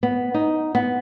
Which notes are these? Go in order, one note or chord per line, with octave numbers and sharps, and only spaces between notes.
B3
D#4
B3